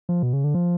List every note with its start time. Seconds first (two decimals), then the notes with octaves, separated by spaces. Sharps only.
0.09 F3
0.23 B2
0.33 C#3
0.44 D3
0.54 F3